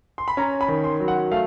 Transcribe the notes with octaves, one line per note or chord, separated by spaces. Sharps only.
C6
B5
C#4 A#5
B5
D#3
C6
F#3
F#5
A3 F5